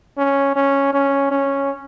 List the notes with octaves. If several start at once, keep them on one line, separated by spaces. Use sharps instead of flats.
C#4
C#4
C#4
C#4